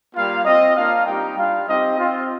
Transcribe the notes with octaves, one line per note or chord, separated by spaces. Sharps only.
G3 A#3 F4 F5
C4 F4 D#5
A#3 D4 F4 F5
G3 C4 D#4 G4 G5
G3 D4 F4 F5
C4 D#4 G4 D#5
C4 F4